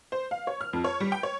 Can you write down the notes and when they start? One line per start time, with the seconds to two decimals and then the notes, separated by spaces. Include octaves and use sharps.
0.12 C5
0.31 F5
0.47 C#5
0.61 F6
0.73 F2
0.84 C#5
1.00 G3
1.12 G5
1.23 C#5